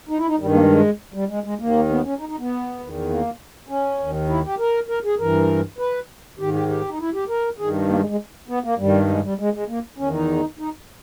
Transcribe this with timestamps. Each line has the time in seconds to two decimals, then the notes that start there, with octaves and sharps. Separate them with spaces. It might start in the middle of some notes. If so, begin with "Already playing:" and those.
0.09 D#4
0.18 E4
0.27 D#4
0.40 G2 D#3 G3
0.49 G#3
0.54 A#3
0.59 G#3
0.69 G#3
1.14 G3
1.29 G#3
1.44 G#3
1.59 D#2 D#3 A#3
1.89 B3
2.04 C#4
2.19 D#4
2.29 D#4
2.39 B3
2.79 E2 D#3
3.09 A#3
3.69 C#4
3.99 D#2 D#3
4.29 E4
4.45 G4
4.59 A#4
4.89 A#4
5.04 G#4
5.19 G2 E3 A#4
5.79 B4
6.39 G#2 D#3 G4
6.54 G4
6.69 G4
6.89 D#4
6.99 E4
7.14 G4
7.28 A#4
7.58 G2 D#3 G#4
7.88 A#3
7.99 G#3
8.09 G#3
8.48 B3
8.64 A#3
8.78 G2 D#3 G3
9.09 G#3
9.23 G3
9.39 G#3
9.54 G#3
9.68 A#3
9.98 E2 D#3 C#4
10.13 D#4
10.59 D#4